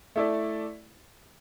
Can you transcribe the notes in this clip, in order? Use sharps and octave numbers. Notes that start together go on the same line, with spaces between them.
A3 E4 A4 D5